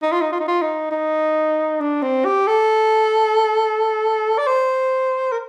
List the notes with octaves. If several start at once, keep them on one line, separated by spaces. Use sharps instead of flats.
D#4
F4
D#4
F4
D#4
F4
D#4
D#4
D4
C4
G4
A4
D5
C5
A#4